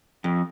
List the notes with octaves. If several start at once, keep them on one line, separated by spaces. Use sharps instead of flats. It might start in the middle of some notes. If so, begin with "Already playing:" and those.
F2